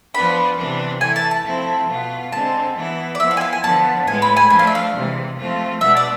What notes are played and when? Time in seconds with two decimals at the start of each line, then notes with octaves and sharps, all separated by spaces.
0.14 F3 B3 D4 B5
0.58 C3 E3 B3 D4
1.01 E3 A3 E4 G#5
1.16 A5
1.31 A5
1.45 F3 A3 C4 E4
1.89 B2 B3 F4
2.32 D3 G#3 C4 A5
2.76 E3 B3 E4
3.15 D5
3.19 F3 B3 E4 E5
3.31 F5
3.37 G#5
3.41 F5
3.53 G#5
3.64 D3 F3 B3 A5
4.07 A2 G#3 B3 G#5
4.22 B5
4.37 G#5
4.50 F3 A3 D4 G#5
4.59 F5
4.67 E5
4.75 F5
4.94 C3 E3 G#3
5.38 F3 A3 C4 F4
5.81 B2 G#3 B3 D4 E5
5.97 D5